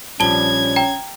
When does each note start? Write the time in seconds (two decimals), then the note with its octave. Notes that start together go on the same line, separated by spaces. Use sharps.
0.20 A#1 F3 G3 C#4 A5 G#6 G7
0.76 G5 A#5